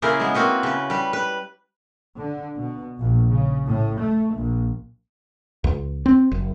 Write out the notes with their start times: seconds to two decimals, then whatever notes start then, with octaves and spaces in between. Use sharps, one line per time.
0.02 C#3 A#3 E4 G#4 A#4 C5
0.20 G#3 B3
0.34 A#3 C4 F#4 B4
0.63 C#3 B4
0.90 G3 B4
1.13 B4
2.17 D3
2.55 B2
2.99 A#1
3.30 C#3
3.69 A2
4.01 A3
4.34 A#1
5.64 C#2
6.06 C4
6.31 F#1